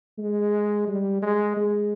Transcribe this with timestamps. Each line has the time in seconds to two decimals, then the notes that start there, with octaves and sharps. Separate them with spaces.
0.18 G#3
0.87 G3
1.22 G#3
1.57 G#3